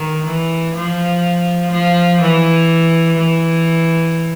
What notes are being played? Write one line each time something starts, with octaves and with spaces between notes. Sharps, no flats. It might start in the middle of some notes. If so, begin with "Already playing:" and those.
Already playing: D#3
E3
F3
F3
E3
E3